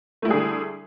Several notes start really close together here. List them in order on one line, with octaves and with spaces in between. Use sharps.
A3 E4 G3 G#4 D3